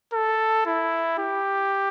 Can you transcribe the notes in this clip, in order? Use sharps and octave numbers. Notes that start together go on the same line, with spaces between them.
A4
E4
G4